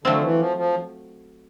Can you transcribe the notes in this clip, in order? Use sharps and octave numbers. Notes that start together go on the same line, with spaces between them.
D3 F#3 A3 C4 F4
F3
E3
F3
F3